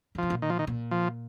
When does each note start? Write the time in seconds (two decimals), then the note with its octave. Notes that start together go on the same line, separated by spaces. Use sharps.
0.15 C#3
0.18 C3 F3
0.30 A#2
0.42 D#3
0.50 F3
0.59 D#3
0.67 A#2
0.91 F3